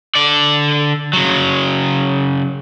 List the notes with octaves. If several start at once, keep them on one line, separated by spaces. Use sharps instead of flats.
D3 D5
C#3 F#3